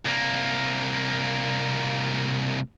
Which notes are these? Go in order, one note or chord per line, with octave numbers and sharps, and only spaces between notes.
C2 A#3